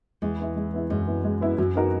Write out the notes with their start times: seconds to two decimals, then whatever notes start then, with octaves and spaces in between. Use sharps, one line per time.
0.22 E2 G#3
0.39 B3 E4
0.57 G#3
0.74 B3 E4
0.90 F#2 G#3
1.07 B3 E4
1.24 G#3
1.41 B3 E4
1.58 F#2 F#3
1.75 B3 D#4 F#4 A#4